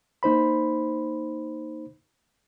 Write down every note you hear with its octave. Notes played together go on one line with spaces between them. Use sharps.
A#3 D#4 C5 B5